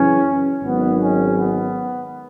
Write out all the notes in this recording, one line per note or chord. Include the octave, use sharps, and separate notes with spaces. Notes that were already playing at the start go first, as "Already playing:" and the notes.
Already playing: F#2 C#3 E3 C#4
G#1 G#2 D#3 F#3 B3
C#4
B3